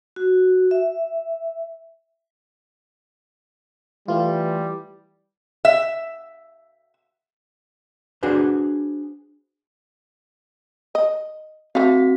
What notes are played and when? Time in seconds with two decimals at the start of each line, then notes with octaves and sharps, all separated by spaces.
0.16 F#4
0.71 E5
4.08 E3 G3 A3 F4
5.65 E5
8.23 D4 F#4 G#4 B4 C5
10.95 D#5
11.75 A3 C4 F#4 F5 B6